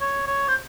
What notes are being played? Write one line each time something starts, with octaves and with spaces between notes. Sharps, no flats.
C#5
C#5
C5